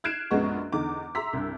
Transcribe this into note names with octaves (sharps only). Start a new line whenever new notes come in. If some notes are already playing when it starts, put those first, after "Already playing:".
F6 F#6 G#6 C7 D7 E7
A#1 F#2 G#3 B3 D#5 C#6
E2 D3 D#4 D6
E5 A#5 C6 E6 B6
C2 G2